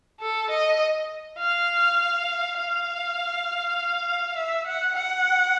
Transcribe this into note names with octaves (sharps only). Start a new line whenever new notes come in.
A4
D#5
F5
F5
E5
F#5
F#5